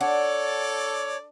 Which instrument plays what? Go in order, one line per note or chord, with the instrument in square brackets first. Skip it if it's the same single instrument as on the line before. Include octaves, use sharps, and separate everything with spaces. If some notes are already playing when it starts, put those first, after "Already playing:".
[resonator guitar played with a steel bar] D4 [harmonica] A4 D5 [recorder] C#5 [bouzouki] F#5